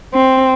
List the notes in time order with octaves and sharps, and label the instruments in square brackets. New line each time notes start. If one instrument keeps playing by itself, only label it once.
[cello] C4